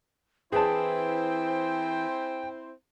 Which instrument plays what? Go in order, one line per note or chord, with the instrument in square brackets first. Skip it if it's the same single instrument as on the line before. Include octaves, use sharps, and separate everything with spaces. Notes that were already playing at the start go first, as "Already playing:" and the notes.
[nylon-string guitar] E3 D4 [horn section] C4 E4 C5 [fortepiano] G#4 A5 [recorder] G5